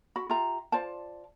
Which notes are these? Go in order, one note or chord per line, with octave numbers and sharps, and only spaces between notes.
F#4 B5
F4 G4 E5 A#5
F4 C5 D5 A5